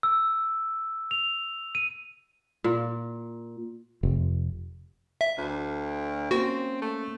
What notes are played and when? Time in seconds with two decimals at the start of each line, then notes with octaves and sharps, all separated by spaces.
0.03 E6
1.11 F7
1.75 D#7
2.64 A#2
4.03 F1
5.21 E5
5.38 D2
6.31 A#3 C4 C#4 F#4
6.82 A3